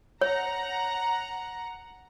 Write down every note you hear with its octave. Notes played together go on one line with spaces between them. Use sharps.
C#5 F#5 A#5